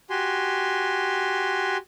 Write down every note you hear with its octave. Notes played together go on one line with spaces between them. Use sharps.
F#4 G4 G#5 C6